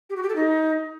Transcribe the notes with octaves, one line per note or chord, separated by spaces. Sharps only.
G4
F#4
G4
A4
D#4